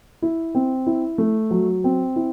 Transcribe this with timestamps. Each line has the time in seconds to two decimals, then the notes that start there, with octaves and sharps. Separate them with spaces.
0.22 E4
0.55 C4
0.87 E4
1.18 A3
1.51 F#3
1.84 C4
2.16 E4